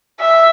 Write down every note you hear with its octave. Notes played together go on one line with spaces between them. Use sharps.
E5